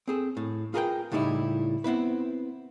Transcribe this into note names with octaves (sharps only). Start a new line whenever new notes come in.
C4 G#4 A4
A2
F4 G#4 A#4 B4 F5 G5
C#2 A2 G3 D#4 E4 G4
B3 C4 E4 B4